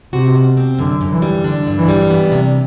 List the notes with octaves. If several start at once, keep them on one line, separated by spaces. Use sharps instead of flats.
C3 F#4
B2
C4
F#2 D3
F#2
E3
G3
D3 D4
G2
E3
G3
E3 B3
C3